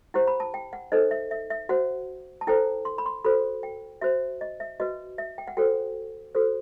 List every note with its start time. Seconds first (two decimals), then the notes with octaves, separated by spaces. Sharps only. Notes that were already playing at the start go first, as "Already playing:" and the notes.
0.14 E4 G4 C5 F#5
0.27 B5
0.40 A5
0.54 G5
0.73 F#5
0.92 D#4 A4 C5 D#5
1.11 E5
1.31 E5
1.50 E5
1.69 F#4 C5 F#5
2.41 A5
2.47 E4 A4 C5 G5
2.85 C6
2.98 B5
3.06 C6
3.24 F#4 A4 C5 B5
3.63 G5
4.01 F#4 C5 E5
4.41 D#5
4.60 E5
4.80 F#4 B4 D#5
5.18 E5
5.38 G5
5.47 F#5
5.57 F#4 A4 C5 G5
6.35 F#4 A4 C5